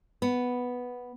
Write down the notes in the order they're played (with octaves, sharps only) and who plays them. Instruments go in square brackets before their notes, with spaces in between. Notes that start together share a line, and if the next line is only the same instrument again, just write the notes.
[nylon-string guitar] B3